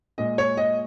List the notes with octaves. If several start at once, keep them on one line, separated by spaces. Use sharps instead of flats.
A#2 G#3 D#5
C#5
D#5